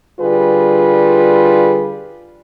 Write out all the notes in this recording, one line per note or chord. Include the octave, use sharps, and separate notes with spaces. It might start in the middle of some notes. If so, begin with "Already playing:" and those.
D3 G3 F4 G#4 B4